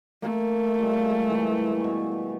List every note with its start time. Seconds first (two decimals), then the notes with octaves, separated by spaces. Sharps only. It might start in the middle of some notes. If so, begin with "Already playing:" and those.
0.22 A3 A#3
0.79 G3 G#3 F4
1.29 E3
1.80 B2 C#6